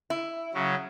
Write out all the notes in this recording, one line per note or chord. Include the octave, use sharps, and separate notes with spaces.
E4
C#3 F#3